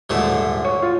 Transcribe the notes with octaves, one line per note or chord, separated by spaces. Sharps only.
D#1 G#2 D3 A3
C#5
F4